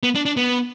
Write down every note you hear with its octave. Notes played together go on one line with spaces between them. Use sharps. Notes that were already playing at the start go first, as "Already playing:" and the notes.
B3
D4
D4
B3